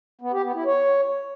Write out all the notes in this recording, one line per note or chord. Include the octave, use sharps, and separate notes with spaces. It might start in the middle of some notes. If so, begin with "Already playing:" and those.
B3
G4
B3
E4
C#5